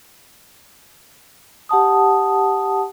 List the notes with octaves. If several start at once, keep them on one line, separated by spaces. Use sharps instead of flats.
G4 F#5 A5 D#6